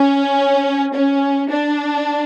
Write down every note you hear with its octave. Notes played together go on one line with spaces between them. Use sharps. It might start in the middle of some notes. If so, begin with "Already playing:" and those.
Already playing: C#4
C#4
D4